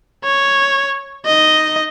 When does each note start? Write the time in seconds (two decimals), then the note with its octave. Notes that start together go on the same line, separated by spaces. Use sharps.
0.24 C#5
1.26 D#4 D#5